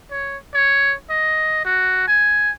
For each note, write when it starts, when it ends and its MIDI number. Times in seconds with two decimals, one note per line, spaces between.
0.11 0.37 73
0.54 0.94 73
1.10 1.62 75
1.65 2.07 66
2.07 2.51 80